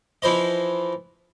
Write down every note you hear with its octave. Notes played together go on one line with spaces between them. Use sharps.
E3 F3 E4 C5 D#5